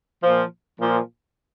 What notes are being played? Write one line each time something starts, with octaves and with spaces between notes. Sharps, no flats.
A#2 F3
A#2 F3